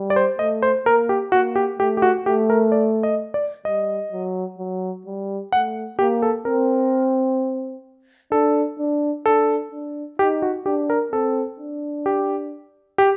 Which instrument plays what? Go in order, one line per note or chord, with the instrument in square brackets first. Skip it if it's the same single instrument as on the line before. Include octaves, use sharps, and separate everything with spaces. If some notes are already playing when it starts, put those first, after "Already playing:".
Already playing: [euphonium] G3
[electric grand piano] D5
C5
[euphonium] A3 [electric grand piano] D#5
[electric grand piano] C5
[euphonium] A#3 [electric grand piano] A#4
[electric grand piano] G4
[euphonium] A#3 [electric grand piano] F#4
[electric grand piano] G4
[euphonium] A3 [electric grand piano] G4
[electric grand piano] G4
F#4
[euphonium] A3 [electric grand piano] G4
[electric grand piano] A#4
D5
D#5
D5
[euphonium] G3 [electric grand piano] D#5
[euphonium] F#3
F#3
G3
[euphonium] A3 [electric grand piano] F#5
[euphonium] A#3 [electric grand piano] G4
[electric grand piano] A4
[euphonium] C4 [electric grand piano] A#4
[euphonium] D4 [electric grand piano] A4
[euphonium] D4
[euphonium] D4 [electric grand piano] A4
[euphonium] D4
[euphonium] D#4 [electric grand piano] G4
[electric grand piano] F#4
[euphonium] D4 [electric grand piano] G4
[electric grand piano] A#4
[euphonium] C4 [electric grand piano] A4
[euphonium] D4
[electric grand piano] G4
G4